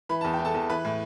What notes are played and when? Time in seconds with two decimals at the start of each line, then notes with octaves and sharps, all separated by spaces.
0.09 E3 B5
0.21 E2 A5
0.33 G5
0.39 E3
0.45 A4 A5
0.54 E2
0.70 E3 B4 B5
0.85 A2